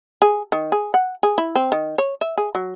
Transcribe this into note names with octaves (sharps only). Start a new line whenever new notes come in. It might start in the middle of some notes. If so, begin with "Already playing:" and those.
G#4
D#3
G#4
F#5
G#4
E4
C4
D#3
C#5
E5
G#4
F#3